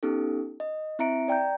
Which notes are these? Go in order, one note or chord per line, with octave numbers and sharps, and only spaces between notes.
B3 C#4 D#4 G4 A4
D#5
C4 E4 E5 A#5 C#7 D7
D5 G5 A#5 G6